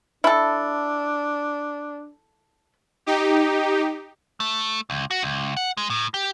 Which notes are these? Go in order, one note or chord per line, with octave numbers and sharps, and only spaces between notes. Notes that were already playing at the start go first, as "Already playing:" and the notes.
D4 E4 A4
D#4 G4
A3
C#2
F#4
C#2
F#5
G#3
A2
G4